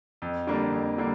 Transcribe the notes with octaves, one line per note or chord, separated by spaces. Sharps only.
F2
D3 G3 A#3 D4
F2
D3 G3 A#3